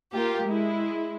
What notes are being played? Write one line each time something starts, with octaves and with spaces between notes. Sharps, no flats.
A#3 F4 G4 A#4
G#3 E4